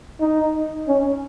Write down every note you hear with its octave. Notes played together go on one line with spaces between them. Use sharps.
D#4
C#4